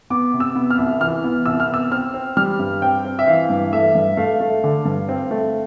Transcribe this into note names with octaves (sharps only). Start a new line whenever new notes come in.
B3 D6
C3
E6
B3
F6
C2
E3 F6
B3
C2 E6
F6
B3
E6
C4 F6
C4
G3 F6
G2
C4 G5
C4
E5
E3 F5
G2
A3 E5
G2
A3 F5
A3
D3
G2
C4
A3